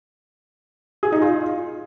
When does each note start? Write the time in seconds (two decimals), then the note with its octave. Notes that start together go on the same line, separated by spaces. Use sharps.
1.03 G#4
1.12 D#4
1.22 F4